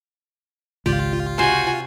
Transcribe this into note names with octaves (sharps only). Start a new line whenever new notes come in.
G#1 C#2 F4 G4 D5
C3 F#4 C5 G#5